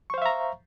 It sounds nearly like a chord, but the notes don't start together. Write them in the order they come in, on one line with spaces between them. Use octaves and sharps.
C#6 C5 F5 E5 A#5